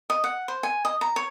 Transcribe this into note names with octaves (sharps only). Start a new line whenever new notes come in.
D#5
F#5
C5
G#5
D#5
A#5
C#5